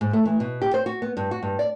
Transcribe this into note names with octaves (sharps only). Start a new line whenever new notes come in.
G#2
A3
E3
B2
G4
C5
F#4
B3
G2
F#4
G2
D5